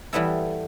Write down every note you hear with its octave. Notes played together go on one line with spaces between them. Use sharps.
E3 G3 B3 E4 A4